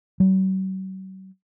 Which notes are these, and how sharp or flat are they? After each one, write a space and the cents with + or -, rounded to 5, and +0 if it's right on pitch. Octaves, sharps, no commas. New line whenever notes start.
F#3 +45